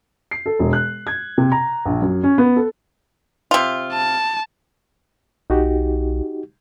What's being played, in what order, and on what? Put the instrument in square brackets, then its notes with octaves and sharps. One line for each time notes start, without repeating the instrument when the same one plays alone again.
[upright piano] C7
A4
E1
F#6
G#6
C3
A#5
A#1
F#2
C#4
B3
A4
[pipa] C3 F4
[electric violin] A5
[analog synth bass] B1 [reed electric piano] D#4 F#4 G4